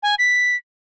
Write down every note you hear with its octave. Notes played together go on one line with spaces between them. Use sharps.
G#5
B6